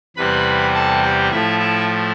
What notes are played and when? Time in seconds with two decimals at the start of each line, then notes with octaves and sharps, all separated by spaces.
0.16 E2 C3 G3 C4 B4 B5
0.74 A4 A5
1.02 G4 G5
1.31 A2 F3 A3 E4 E5
1.59 E4 E5